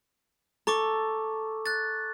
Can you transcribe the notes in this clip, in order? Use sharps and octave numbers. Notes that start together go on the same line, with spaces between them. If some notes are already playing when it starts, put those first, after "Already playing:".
A4 A#5 C#6 D6
F#6 A6